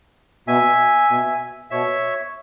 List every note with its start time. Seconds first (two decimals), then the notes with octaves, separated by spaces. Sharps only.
0.47 B2 E5 G#5
1.10 B2
1.70 B2 C#5 E5